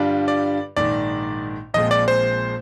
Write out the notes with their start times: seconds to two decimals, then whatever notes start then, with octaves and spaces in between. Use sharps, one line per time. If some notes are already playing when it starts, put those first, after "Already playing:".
Already playing: G2 D3 G3 D4 F4
0.28 D5
0.77 A#1 G#2 D#3 D5
1.74 A#1 A#2 F3 G#3 C4 D#5
1.91 D5
2.08 C5